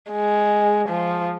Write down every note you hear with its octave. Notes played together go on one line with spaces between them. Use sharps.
G#3
F3